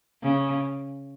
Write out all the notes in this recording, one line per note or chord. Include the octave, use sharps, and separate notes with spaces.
C#3